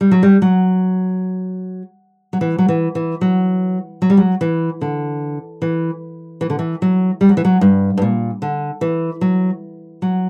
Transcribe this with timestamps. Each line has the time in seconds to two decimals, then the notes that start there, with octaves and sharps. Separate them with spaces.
0.01 G3
0.11 F#3
0.23 G3
0.42 F#3
2.33 F#3
2.41 E3
2.58 F#3
2.68 E3
2.95 E3
3.21 F#3
4.02 F#3
4.10 G3
4.17 F#3
4.41 E3
4.81 D3
5.62 E3
6.41 E3
6.50 D3
6.59 E3
6.82 F#3
7.21 G3
7.29 F#3
7.37 E3
7.45 F#3
7.61 G2
7.97 G2
8.02 A#2
8.42 D3
8.81 E3
9.21 F#3
10.02 F#3